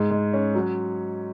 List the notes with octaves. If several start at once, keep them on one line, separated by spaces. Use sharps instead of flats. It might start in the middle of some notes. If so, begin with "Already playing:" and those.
Already playing: G#2 G#3
G#3
C#4
F#3